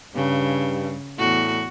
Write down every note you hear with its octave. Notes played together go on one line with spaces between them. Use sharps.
G2 C#3
E2 A2 F#4